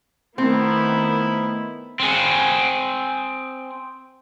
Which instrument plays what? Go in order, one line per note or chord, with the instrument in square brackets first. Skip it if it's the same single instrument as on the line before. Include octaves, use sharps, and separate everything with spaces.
[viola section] D#3 B3 [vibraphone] A3 [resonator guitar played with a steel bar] C4 [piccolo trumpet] E4
[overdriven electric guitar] C4 G#4